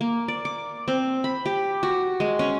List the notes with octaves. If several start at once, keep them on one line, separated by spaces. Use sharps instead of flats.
A#3
D5
D6
C4
B5
G4
F#4
G#3
C#4